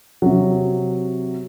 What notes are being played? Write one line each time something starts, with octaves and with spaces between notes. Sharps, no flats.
C3 F#3